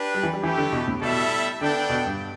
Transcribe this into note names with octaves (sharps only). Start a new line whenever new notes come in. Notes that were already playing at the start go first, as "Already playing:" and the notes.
Already playing: D4 G4 B4
G3
E3
G3
E3 A3 E4 G4
D3
B2
A2
B2 G3 E4 A4 E5
D3 B3 D4 A4 D5 G5
B2
G2